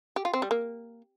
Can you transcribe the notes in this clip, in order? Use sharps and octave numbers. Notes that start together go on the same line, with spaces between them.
G4
F4
C4
G3
A#3